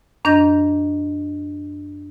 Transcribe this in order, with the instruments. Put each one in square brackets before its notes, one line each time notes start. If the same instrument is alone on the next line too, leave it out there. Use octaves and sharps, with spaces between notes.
[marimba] F#2 D4 D#5 G6 A#6